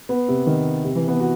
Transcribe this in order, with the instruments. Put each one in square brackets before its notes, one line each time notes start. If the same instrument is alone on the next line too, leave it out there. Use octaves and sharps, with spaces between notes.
[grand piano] B3
C3
D#3
C3
E3
B3
F#4